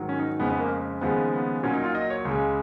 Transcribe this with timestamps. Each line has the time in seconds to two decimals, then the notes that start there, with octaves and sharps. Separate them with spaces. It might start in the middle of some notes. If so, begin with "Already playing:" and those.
Already playing: G#2 D#3 F#3
0.09 C#4
0.19 D#4
0.40 F2 C#3 G#3 B3
0.50 B3
0.60 A#3
1.01 D#2 C#3 F3 G#3 B3
1.33 B3
1.63 A#2 F#3 C#4
1.73 D#4
1.84 F4
1.95 D#5
2.10 C#5
2.25 C#2 C#3 G#3